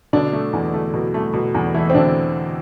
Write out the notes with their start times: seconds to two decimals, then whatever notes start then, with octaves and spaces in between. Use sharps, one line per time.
0.13 B2 D3 D4
0.33 A3
0.53 E2
0.74 A3
0.94 B2
1.14 A3
1.33 B2
1.55 E2
1.74 E3 A3 E4
1.90 C4
1.95 B2 D3 D4